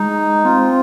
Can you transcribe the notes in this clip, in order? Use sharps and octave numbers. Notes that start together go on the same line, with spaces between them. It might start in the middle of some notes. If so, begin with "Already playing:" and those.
Already playing: G#3 D#4
C4 F4